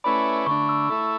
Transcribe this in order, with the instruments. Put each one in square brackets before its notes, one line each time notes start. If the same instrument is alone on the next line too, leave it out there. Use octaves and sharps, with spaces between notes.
[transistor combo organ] A3 C#4 E4 B4 D5 [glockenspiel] B5
[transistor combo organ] D3 A3 D4 [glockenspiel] C#6
[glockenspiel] E6
[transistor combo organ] A3 E4 A4